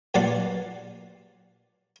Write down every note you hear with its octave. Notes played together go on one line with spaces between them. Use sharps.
G2 A#2 F#3 D5 F#5 C6